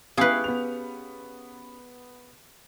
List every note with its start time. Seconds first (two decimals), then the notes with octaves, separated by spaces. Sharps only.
0.17 B3 C#4 E4 G4 G#4 B4 F5
0.44 B3 F7